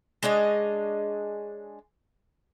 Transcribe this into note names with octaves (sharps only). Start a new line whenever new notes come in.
G#3 D4 C#5 D#5